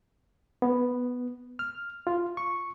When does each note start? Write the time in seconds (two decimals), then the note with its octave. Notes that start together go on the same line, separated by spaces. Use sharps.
0.62 B3
1.59 F6
2.07 F4
2.37 C#6